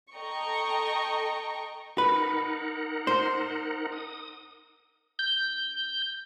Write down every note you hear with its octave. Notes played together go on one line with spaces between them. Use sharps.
A4 D#5 G5 A#5 C#6
D#4 A#4 B4 F#5
C5
D#6
G6